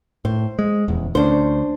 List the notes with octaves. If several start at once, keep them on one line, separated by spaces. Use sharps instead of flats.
A2 C5
G#3
D#1 E2
D2 C#4 D4 C5